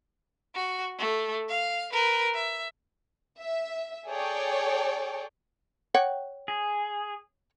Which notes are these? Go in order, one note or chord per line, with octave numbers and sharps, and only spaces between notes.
F#4
A3
F5
A#4 B4
E5
E5
G#4 A4 C#5 D5 G5
C#5 F#5 G5
G#4